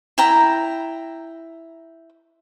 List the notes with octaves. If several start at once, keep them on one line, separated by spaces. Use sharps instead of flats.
E4 G5 A#5